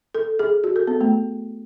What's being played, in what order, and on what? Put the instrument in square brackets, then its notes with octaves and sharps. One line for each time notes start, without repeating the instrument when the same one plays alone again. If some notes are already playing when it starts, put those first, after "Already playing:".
[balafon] A4
G#4
F#4
A4
B3
A3